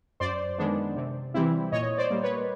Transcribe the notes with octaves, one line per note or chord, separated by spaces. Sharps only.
F#2 C5 D5
D#3 G#3 B3 D4
C3
E3 G3 C4 E4
A#2 C#5 D#5
C5 D5
G3 A#3
B4 C#5